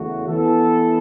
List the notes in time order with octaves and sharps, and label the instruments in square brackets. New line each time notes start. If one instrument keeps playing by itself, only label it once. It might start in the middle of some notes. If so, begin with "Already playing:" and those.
Already playing: [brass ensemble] E2 C#3 A3 F#4
E3 B3 A4